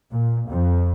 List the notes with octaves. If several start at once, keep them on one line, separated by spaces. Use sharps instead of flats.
A#2
F2